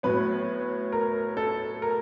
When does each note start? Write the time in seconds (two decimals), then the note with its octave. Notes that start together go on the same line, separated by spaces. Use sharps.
0.03 A2 F#3 B3 B4
0.92 A#4
1.37 A4
1.82 A#4